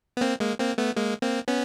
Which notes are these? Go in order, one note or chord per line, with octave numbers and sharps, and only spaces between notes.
B3
A#3 C4
G#3 A#3
A#3 C4
A3 B3
G#3 A#3
A#3 C4
B3 C#4